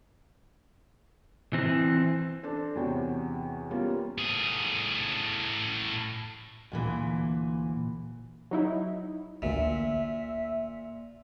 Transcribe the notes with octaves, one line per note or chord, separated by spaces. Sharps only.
E3 C4
D4 A4 C5
E2 C3 F#4 C#5 G5
G3 A#3 B3 C#4 F4
A2 G#4
D2 A#2 E3
F#3 D#4 E4
A1 D2 A#2 E5